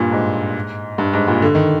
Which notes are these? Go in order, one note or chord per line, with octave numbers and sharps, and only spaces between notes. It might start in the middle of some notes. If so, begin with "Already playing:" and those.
Already playing: G2 A#2
G#2
G2
G#2
G2 A#2
D3
D#3